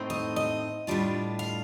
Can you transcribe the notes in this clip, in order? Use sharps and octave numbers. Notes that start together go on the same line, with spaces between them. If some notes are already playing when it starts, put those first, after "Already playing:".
Already playing: A2 A3 C4 D#4
D#5
D#5
A2 G3 D4 F4
F5